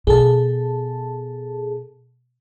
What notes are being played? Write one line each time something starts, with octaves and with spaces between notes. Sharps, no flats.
B2 G#4 A4 A5